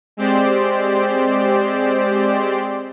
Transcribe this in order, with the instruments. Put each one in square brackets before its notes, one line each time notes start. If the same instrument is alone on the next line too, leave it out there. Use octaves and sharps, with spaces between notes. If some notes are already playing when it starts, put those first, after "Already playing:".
[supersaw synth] G#3 C4 G4 C5 D5